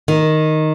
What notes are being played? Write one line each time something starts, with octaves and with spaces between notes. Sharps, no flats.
D#3